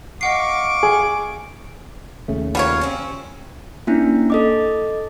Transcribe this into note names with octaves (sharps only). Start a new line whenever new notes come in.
D#5 F5 F#5 C#6 D6 C7
G#4
D#2 C#3 A3
F#3 G3 F4 A#4 C#5
C4 C#4
A#3 C#4 D4 E4
A4 D#5 D6